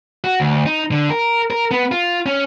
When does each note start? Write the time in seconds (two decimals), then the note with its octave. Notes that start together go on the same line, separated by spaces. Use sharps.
0.24 F#4
0.40 D2
0.66 D#4
0.91 D3
1.10 A#4
1.50 A#4
1.71 B3
1.92 F4
2.26 C#4